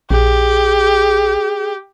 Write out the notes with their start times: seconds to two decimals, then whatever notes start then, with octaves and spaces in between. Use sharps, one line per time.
0.11 A#1 G4 G#4